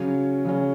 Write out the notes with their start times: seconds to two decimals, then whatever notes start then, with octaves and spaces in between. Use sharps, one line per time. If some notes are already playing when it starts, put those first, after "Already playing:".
Already playing: C#3 F#3 C#4
0.45 C#3 F#3 C#4